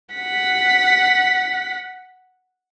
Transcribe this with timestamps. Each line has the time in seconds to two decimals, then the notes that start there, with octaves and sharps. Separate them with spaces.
0.15 F#5 B6